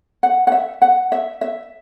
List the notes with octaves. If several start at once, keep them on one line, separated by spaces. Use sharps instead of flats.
F#5
F#5
E5
F#5
E5
E5